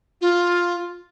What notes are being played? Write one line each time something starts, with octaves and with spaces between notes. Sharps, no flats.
F4